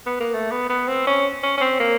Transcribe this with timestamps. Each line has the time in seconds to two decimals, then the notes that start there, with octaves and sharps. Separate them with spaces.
0.06 B3
0.20 A#3
0.34 A3
0.51 B3
0.70 B3
0.88 C4
1.07 C#4
1.43 C#4
1.57 C#4
1.61 C4
1.80 A#3